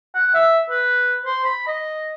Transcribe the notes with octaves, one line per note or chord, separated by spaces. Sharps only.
F#5
E5
B4
C5
B5
D#5